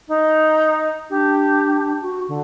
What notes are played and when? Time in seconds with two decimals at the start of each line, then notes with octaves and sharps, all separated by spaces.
0.08 D#4
1.10 D4 G4
2.01 F#4
2.28 D3